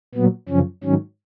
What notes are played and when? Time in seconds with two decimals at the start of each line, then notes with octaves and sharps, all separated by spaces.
0.15 A#2 F#3 B3
0.49 F#2 C#3 F3 C#4
0.83 G#2 D#3 F#3 C#4